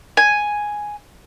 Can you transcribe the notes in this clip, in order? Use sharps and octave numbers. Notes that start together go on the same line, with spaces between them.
G#5